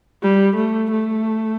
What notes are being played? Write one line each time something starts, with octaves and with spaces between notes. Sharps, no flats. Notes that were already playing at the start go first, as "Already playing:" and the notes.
G3
A3
A3